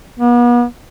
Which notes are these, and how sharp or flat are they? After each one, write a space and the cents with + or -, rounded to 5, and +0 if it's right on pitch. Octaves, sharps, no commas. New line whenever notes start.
B3 -40